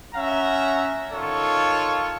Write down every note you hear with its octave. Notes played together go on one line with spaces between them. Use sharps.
C#4 E5 F#5 A#5
D#3 F4 A4 C#5